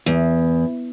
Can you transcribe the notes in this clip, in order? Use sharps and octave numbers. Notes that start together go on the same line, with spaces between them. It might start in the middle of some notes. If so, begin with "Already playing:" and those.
E2